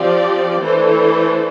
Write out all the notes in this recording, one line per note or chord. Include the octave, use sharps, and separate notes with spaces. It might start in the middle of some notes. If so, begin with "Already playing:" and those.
Already playing: F3 C4 G4 D5
E3 A3 D4 A4 C5